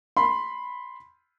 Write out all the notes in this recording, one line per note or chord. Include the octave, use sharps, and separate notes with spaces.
B5 C6